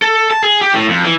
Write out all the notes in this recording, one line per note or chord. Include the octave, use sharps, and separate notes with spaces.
A4
A5
G#4
G4
A2
F2
E3